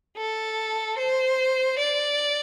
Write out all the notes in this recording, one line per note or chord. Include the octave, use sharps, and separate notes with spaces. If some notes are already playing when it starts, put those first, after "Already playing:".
A4
C5
D5